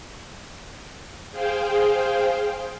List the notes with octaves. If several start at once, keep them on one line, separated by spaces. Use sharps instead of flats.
G#4 C5 F5 G5